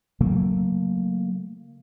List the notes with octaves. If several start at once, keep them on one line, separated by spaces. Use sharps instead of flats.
C#3 F#3 A3 A#3